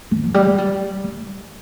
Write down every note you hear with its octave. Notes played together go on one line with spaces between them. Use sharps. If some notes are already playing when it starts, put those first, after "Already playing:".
D#3
F3
G3
G#3
G3
G#3